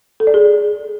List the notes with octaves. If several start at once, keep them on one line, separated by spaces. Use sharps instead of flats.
A4
D5
G#4